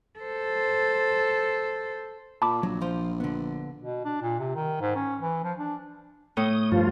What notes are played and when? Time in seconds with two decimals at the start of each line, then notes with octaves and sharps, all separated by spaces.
0.19 A4 C5
2.42 A#2 A5 B5 D6
2.63 A#1 F#3
2.81 F3 F4 C5
3.20 D3 B3
3.82 B2
4.05 D4
4.22 A#2
4.39 C3
4.55 D#3
4.81 G#2
4.96 C#4
5.21 E3
5.44 F3
5.59 D4
6.37 A2 D#6
6.72 G2 F3 F4